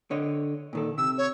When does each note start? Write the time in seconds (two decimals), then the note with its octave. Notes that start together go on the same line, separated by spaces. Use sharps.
0.11 D3 C#5 D#5
0.73 A#2 D#3 A4
0.98 C3 E6
1.18 C#5